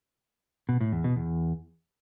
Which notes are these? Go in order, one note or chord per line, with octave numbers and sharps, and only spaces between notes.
B2
A2
E2
B2
E2